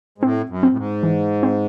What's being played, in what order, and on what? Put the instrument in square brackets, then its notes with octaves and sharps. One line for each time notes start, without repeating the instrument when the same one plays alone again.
[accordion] G#2
[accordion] A2 [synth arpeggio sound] C4
[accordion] F#2
[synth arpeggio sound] C4
[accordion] A2
G#2
[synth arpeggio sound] E3
C4